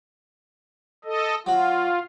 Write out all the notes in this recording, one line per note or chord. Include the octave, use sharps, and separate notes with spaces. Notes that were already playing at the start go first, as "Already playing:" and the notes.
A4 D#5
F#3 F4 F#4